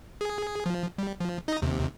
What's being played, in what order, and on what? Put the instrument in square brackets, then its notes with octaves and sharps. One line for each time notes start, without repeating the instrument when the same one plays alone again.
[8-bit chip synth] G#4
F3
G3
F3
D#4 D#5 A#6
D#2 C3